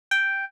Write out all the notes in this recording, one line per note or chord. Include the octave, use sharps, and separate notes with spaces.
G5